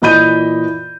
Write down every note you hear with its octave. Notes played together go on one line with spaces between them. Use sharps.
A#2 E3 D#5 B5 G6 D#7